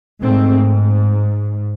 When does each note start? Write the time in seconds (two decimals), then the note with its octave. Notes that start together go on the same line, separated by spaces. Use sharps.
0.21 G#2 A3 C4